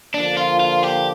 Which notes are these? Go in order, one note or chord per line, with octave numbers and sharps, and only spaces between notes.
D3 F3 A#3 D4
F4
F4
G4